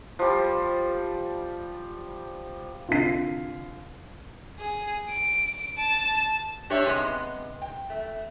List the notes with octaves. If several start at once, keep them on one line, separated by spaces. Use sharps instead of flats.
F3 G3
C2 D3 F4 C7
G#4
D7
A5
D4 G4 C#5 D5 E5
C3 G#3 B3 D#4
G5
A3